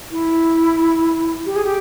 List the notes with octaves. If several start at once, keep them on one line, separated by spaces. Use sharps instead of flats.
E4
G4
G#4
G4